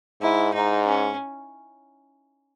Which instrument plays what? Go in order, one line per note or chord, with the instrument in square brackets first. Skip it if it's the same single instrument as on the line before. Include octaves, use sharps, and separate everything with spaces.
[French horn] G#2 [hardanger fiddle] E4
[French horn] G#2 [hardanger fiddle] D#4
[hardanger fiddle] C#4